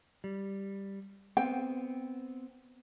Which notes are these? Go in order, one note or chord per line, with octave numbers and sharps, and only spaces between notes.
G3
B3 C4 G5